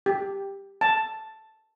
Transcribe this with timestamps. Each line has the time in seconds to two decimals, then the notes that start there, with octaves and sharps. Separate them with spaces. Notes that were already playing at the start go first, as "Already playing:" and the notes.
0.06 G4
0.81 A5